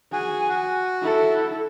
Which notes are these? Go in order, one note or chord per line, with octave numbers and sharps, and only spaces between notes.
F#4 G#4 G#5
F#4
E4 A4